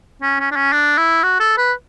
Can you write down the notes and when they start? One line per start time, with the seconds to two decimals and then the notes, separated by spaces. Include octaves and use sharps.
0.22 C#4
0.40 C#4
0.52 D4
0.56 C#4
0.73 D4
0.98 E4
1.23 F#4
1.40 A4
1.58 B4